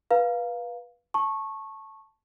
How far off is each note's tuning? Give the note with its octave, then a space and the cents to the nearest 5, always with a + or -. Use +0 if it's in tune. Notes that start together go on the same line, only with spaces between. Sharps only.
B4 -20 F5 +0 A#5 +0
A5 +0 C#6 -15